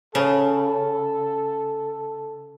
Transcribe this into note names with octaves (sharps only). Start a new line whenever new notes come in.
C#3 A4